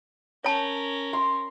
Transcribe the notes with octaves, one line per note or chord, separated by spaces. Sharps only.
C#4 A#4 C#5 A5
C6